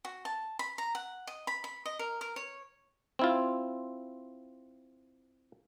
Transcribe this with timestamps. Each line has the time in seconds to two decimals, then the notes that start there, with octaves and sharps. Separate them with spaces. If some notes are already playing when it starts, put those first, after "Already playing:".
0.05 F#4
0.25 A5
0.59 B5
0.78 A#5
0.95 F#5
1.27 D#5
1.47 B5
1.64 B5
1.86 D#5
1.99 A#4
2.21 A#4
2.36 C#5
3.19 C4 E4 F4